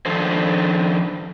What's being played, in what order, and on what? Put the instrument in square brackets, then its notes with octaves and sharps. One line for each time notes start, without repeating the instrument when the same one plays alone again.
[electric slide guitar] D#3 F3 D4 A4 C5